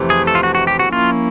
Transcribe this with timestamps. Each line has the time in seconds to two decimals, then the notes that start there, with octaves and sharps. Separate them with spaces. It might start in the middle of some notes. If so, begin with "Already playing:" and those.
Already playing: F2 C3 E3 A3
0.10 G#4
0.27 A4
0.35 F4
0.43 F#4
0.55 F#4
0.67 G4
0.79 F#4
0.92 F3 A#3 C#4 E4 F4